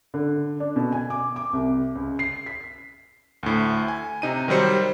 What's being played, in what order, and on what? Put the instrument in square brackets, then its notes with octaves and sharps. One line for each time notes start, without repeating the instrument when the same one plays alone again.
[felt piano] D3
D4
B2
G#5
D6
D6
C2
C#2
C7
B6
[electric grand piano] D2 A2
G#5
C3 D#4 D#7
D#3 F#3 G3 C5 C#7